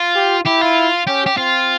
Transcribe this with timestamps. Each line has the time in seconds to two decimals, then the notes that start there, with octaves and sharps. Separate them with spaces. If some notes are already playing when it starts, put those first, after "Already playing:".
Already playing: F4
0.15 G4
0.45 E4 G4
0.61 F4
1.07 C#4 G4
1.26 G4
1.37 C4 F4